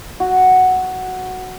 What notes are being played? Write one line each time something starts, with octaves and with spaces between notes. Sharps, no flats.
F#4